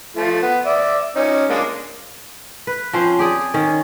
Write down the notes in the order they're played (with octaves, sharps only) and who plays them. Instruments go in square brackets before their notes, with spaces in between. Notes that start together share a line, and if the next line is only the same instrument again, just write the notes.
[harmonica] F3 A3
B3
D5 E5
C#4 D#4
G#3 A#3 D4
[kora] B4
F3 C4 C#4 C5
G4 G#4 D5
D#3 C#4